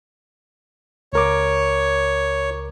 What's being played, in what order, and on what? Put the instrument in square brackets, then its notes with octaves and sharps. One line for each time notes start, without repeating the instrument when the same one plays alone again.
[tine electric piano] C#2 A#4 D6 [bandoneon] C#5